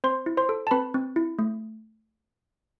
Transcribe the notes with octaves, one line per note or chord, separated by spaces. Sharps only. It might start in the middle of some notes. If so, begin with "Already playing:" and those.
C4 C5 C6
E4
C5 C6
A4
A5
C4 B4 B5
C4
E4
A3